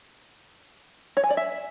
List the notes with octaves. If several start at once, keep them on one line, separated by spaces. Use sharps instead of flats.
C#5
G#5
D5
E5